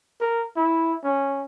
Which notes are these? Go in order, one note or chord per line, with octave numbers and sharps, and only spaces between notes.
A#4
E4
C#4